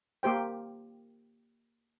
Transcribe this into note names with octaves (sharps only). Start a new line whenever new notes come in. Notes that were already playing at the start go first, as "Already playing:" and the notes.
A#3 G4 C5 G5